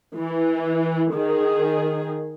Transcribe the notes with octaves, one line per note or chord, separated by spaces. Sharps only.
E3
D#3 G#4